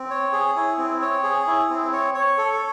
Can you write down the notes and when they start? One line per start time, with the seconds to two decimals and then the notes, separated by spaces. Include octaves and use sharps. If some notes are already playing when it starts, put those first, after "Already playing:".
Already playing: C4
0.10 C#5
0.33 G#4
0.56 E4
0.78 C4
1.02 C#5
1.23 G#4
1.47 E4
1.69 C4
1.92 C#5
2.14 C#5
2.38 A4